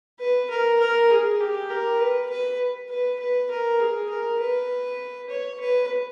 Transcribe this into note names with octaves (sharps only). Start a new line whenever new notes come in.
B4
A#4
A#4
G#4
G4
A#4
B4
B4
B4
B4
A#4
G#4
A#4
B4
C#5
B4